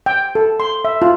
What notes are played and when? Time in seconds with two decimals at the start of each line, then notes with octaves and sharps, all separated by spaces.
0.06 G5
0.35 A4
0.60 C6
0.85 E5
1.02 F4